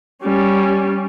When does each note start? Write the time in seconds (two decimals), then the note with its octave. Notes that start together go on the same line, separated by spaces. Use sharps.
0.23 G3 C#4